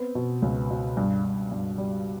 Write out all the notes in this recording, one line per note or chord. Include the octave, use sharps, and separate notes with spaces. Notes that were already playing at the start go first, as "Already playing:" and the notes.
Already playing: B3 C4
B2
C#2
B2
G2
G2
G2
G3